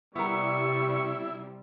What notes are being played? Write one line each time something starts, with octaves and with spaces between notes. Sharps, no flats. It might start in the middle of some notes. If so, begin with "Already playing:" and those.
C3 G3 B3 E4 A#4 C#6